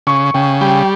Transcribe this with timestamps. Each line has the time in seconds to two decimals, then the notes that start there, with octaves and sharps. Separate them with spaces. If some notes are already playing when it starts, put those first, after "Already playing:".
0.07 C#3 C#6
0.34 C#3 G5
0.61 G3 G5